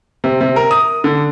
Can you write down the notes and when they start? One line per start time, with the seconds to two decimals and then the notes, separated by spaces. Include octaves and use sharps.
0.24 C3
0.41 C3
0.56 A#4
0.71 D#6
1.04 D3